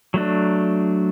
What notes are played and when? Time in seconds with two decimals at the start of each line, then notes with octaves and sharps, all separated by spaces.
0.14 F#3 A3 D4